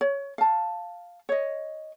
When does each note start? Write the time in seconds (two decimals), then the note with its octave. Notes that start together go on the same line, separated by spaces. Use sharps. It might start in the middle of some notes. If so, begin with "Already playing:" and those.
0.01 C#5
0.38 F5 A5
1.29 C#5 D#5